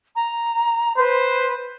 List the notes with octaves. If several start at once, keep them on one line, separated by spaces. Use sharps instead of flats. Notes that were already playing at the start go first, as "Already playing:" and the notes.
A#5
B4 C5